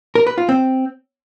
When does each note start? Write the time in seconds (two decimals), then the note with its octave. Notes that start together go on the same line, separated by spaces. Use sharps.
0.15 A#4
0.27 B4
0.38 F4
0.49 C4